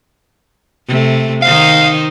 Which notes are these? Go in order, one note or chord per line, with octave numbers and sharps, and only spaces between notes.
C3 A3
D#3 D#4 C5 F5